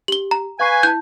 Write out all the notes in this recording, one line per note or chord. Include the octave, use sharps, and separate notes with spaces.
G4 F#7 G7
A#5
B4 F5 G#5 C#6 C7
E4 A5 G6